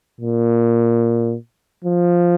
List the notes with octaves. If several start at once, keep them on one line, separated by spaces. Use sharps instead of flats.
A#2
F3